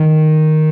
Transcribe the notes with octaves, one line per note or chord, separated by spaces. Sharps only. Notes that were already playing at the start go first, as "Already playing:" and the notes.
Already playing: D#3